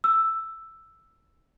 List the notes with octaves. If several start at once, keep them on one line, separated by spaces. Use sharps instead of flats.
E6